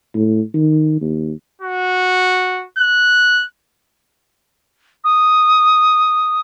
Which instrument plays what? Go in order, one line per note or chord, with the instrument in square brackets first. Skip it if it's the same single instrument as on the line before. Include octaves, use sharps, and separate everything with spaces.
[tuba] A2
D#3
D#2
[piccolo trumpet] F#4
F#6
[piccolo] D#6